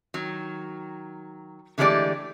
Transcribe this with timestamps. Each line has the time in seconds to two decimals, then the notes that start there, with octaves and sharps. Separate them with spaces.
0.14 D#3 F#3
1.78 D3 E3 G#3 A3 G4 D5